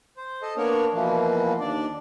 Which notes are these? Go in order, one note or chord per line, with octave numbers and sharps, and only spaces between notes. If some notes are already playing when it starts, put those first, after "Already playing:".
C5
A4 D#5
A#3 B3 D4 A#4 C#5
B2 E3 F3 A#3
D#2 D4 D5